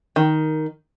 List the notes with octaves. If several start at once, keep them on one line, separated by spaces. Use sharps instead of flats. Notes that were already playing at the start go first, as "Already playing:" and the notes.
D#3